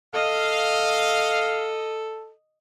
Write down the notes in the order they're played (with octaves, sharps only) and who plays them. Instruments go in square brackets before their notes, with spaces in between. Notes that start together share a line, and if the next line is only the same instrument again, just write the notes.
[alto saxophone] A4 [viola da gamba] D#5 [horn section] F5